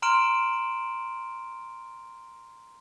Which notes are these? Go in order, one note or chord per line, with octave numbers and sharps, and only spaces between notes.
A#5 C6 F6 D7 E7 F#7